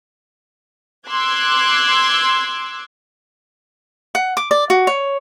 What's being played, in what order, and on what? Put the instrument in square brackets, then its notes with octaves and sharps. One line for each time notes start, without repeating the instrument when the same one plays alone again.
[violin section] C6 D6 E6 F#6 G#6
[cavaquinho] F#5
D6
D5
F#4
C#5